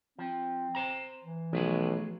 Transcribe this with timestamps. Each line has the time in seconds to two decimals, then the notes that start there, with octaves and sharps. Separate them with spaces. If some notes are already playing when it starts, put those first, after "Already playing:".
0.18 F3 C4
0.75 C5 A#5
1.24 E3
1.53 B1 F3 A3 G#4